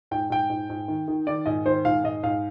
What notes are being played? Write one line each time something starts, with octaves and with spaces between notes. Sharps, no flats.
G#2 G5
G#2 G5
G#2
G#2
D#3
D#3
D#3 D5
G#2 D#5
D#3 C5
G#2 F5
G#2 D#5
G#2 F5